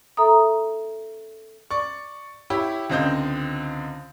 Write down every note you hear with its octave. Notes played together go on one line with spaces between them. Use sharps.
A4 E5 A#5 D#6
D5 C#6
E4 G4 C#5
C#2 D3 C4 D#5 G6